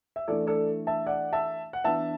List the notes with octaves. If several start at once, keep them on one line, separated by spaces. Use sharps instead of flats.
E5
E3 A3 D4 A4 D5
A4 D5
E5 A5
D5 F#5
E5 A5
F#5
E3 B3 D4 E5 A5